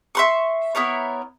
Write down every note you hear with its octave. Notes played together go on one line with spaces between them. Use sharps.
E5 C6 C#6
B3 E4 A#4 C#5